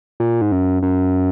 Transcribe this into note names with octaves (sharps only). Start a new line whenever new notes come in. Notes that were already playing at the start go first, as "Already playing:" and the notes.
A#2
G#2
F#2
F#2